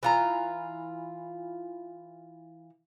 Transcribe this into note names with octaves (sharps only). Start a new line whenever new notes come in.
E3 F4 A#5